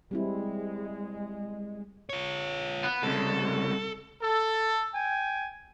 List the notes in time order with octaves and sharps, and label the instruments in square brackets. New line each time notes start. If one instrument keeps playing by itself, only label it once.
[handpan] G3 C4 E4 [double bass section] G#3
[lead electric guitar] F4 C#5
[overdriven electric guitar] B3
[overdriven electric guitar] C2 C#3 [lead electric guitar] A4
[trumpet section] A4
G5 G#5